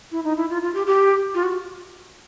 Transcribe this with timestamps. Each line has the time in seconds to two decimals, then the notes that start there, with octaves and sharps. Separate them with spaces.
0.12 E4
0.24 D#4
0.37 E4
0.50 F4
0.62 F4
0.74 G4
0.87 G4
1.34 F4
1.43 F#4